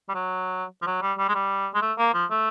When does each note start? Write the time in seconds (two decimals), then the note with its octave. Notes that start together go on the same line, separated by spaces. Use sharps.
0.09 G3
0.14 F#3
0.82 F3
0.87 F#3
1.02 G3
1.18 G3
1.29 G#3
1.35 G3
1.74 G#3
1.82 A3
1.98 A#3
2.14 F3
2.30 A3